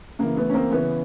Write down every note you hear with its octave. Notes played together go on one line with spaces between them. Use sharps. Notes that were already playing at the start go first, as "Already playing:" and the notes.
C#3 E3 A#3
A3 B3
C#4
A#3 C4
C#3 E3 B3 C#4